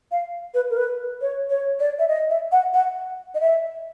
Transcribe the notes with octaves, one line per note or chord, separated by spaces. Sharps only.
F5
B4
A#4
B4
C#5
C#5
D5
E5
D#5
E5
F#5
F#5
D#5
E5